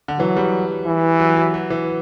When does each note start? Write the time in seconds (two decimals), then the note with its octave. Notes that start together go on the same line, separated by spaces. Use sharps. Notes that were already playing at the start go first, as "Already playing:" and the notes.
0.08 D3
0.19 E3 F#3
0.37 G3
0.86 E3
1.19 F#3
1.36 F#3
1.54 F#3
1.70 E3